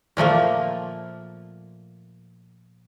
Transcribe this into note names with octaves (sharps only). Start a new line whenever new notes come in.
A#2 F3 A3 A#3